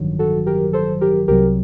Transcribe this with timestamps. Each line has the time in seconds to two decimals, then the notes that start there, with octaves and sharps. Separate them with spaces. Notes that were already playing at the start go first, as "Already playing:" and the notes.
Already playing: A1 G2 D#3 F#3
0.19 F#4 A4
0.46 G4 A#4
0.73 A4 C5
1.01 G4 A#4
1.28 C2 C3 F#3 G4 A#4